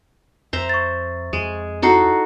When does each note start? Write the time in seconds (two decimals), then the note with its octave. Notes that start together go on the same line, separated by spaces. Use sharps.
0.53 F2 C5 E5 A#5
0.69 C#6 A6
1.33 F2 G#3
1.82 D#4 E4 F#4 A4 A#5 C7